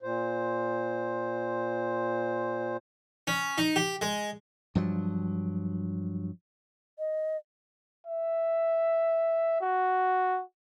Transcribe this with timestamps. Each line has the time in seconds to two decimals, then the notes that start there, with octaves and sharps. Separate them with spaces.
0.02 A#2 C5
3.27 C#4
3.58 D#4
3.76 G4
4.02 G#3
4.75 G2 F3 F#3
6.99 D#5
8.07 E5
9.62 F#4